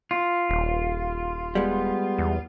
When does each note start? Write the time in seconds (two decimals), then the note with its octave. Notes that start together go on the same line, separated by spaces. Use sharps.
0.11 F4
0.49 D#1
1.55 G3 G#3 B3
2.18 E2